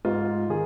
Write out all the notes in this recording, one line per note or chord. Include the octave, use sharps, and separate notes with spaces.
G#2 F4
D#3 G#4